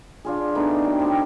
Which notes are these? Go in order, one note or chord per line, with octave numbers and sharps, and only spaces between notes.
D4 F4 G#4
A3 B3 D4 D#4
F#3 G5
C4 G4